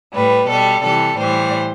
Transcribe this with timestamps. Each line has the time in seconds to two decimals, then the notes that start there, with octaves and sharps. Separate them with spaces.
0.15 A2 G3 B4
0.49 B2 G3 A4
0.83 C3 E3 G3 A4
1.18 A2 E3 G3 C5